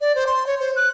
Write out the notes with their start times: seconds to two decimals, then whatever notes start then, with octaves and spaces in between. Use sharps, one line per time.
0.01 D5
0.15 C5
0.27 C6
0.47 C#5
0.60 C5
0.76 F#6